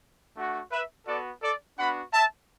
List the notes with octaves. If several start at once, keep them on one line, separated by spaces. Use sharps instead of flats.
A3 D4 F#4
B4 E5
B3 F#4 A4 D5
A4 D5
B3 D4 F#4 F#5 B5
E5 A5